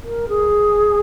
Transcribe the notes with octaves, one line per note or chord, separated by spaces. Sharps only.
A#4
G#4